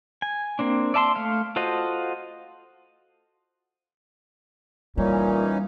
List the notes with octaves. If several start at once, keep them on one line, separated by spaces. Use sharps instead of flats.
G#5
A#3 C4 D4
D5 E5 A5 B5 C6
A3 F5
F4 F#4 A4 C5 D#5
A#2 E3 G3 C#4 D#4